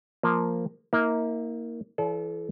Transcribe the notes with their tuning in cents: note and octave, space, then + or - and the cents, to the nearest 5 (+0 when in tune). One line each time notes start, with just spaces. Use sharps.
F3 +0 A#3 +0
A#3 +0 E4 -45
E3 +25 A4 -35 D5 -45